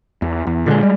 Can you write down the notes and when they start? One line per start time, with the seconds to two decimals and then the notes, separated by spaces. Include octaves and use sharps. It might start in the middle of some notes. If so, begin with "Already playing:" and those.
0.22 E2
0.47 E2
0.66 A#2 D3 G3 G#3
0.83 G3 G#3